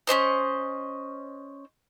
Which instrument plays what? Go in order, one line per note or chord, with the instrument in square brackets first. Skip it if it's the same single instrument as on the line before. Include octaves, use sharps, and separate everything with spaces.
[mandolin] C#4 D4 C5 D#5